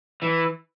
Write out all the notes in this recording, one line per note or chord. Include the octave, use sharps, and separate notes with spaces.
E3